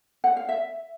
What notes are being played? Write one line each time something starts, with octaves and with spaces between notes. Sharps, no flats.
F#5
F5
E5